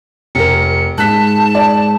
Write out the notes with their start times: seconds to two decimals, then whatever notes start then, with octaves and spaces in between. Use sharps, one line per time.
0.35 F1 A#4 C#7
0.98 G#2 A5 F#6 B6
1.55 D5